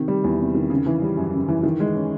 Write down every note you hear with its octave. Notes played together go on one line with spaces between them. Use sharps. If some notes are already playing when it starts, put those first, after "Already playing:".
Already playing: C3 D#3
G3
E2
C3
D#3
C#3
E3
G3
F#2
C#3
E3
D#3
G#3
C#4